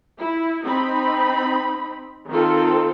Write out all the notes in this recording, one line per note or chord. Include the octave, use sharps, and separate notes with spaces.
E4
C4 D#4 B5
D#3 C4 F4 A4